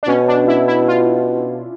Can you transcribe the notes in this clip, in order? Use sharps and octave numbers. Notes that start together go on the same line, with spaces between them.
D4
B2 C#4
D4
E4
E4
F4